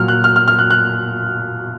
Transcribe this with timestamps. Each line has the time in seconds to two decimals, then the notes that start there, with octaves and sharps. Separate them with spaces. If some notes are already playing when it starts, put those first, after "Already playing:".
Already playing: A#2 F#3 F6
0.08 F#6
0.24 F6
0.36 F6
0.48 F6
0.59 F#6
0.70 F#6